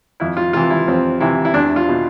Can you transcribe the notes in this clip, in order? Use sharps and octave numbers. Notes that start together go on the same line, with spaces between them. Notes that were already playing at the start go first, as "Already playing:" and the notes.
F2 E4
F4
C3 E3 F4
E4
F2 C4
C3 E3 E4
E4
E2 D4
F4
B2